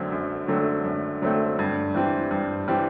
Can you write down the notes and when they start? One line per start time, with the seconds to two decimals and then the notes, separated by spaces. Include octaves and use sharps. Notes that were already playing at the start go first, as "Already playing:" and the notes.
Already playing: F#2 D3 F#3 A3 C4
0.12 F#2
0.48 D3 F#3 A3 C4
0.84 F#2
1.22 D3 F#3 A3 C4
1.59 G2
1.94 E3 G3 C4
2.31 G2
2.68 E3 G3 C4